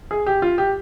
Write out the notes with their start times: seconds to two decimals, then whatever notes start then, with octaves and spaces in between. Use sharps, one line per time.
0.11 G#4
0.26 G4
0.42 F4
0.58 G4